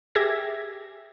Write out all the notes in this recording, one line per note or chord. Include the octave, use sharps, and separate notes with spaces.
G4 G#4 E5 G#6 A#6